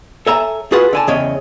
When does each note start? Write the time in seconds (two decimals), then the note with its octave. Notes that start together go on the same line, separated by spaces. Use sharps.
0.27 A4 C#5 E5 G#5 A#5
0.72 F4 F#4 G#4 B4 F5 F#5
0.93 D3 G#5 A5
1.07 E2 C#3 C#5 D#5 G5